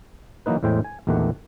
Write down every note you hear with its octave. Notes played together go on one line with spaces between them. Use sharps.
E3 F#3 A#3 D#4 B4
E2 A2 G#3 C5 G5
G#5
A#1 E2 D#3 A3 G4 F#5